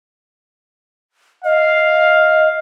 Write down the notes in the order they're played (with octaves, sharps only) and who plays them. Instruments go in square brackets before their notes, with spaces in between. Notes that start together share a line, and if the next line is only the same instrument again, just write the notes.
[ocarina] D#5 [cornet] F5